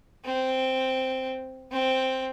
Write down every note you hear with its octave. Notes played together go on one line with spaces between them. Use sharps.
C4
C4